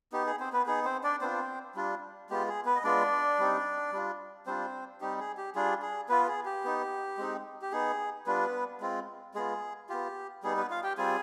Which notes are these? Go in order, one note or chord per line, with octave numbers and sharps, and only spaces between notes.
B3 D#4 G4
G#4
C4 C5
B3 B4
B3 D#4 G#4
C4 C5
D4 D5
B3 C4 D4 F4 C5
G3 D4 F4
G#3 B3 F4 G4
G#4
B3 B4
D#5
G#3 B3 D4 F4 D5
G3 C4 D#4
G3 D4 F4
G3 C4 D4 F4 C5
G3 C4 D#4 G4
G#4
G4
G3 D4 F4 G#4
G#4
B3 F4 B4
G#4
G4
B3 D#4
G#3 C4 D#4
G4
B3 D#4 G#4
G3 B3 D4 F4 B4
G#3 C4 F4
G#3 B3 F4 G#4
B3 F4 G4
G3 B3 D#4 G#4
B3 B4
F4 F5
G4 G5
G3 C4 F4 G#4 G#5